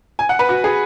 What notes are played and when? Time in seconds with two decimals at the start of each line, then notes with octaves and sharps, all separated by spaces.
0.19 G#5
0.29 F#5
0.39 B4
0.49 F#4
0.64 G#4